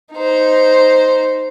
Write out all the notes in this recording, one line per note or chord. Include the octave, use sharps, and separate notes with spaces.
D#4 C5